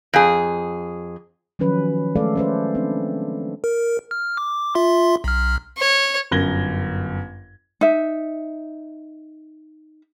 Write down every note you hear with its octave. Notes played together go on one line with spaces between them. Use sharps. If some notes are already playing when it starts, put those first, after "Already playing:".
F2 G#4
D#3 F3 F#3 C#4 B4
G#3 A3 A4 D5 F5
C#4 B4 C5
C4 D4
A#4
F6
D6
F4 E5 C6
B1 F6
C#5
G1 F#2 G#6 A#6 G7
D#4 E5